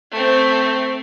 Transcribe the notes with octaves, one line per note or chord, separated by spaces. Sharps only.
A3 C4